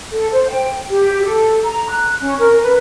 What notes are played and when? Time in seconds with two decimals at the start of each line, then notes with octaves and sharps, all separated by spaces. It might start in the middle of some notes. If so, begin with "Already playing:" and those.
0.11 A4
0.32 C5
0.50 G5
0.89 G4
1.24 A4
1.63 A#5
1.90 F#6
2.21 C#4
2.39 A#4
2.60 B4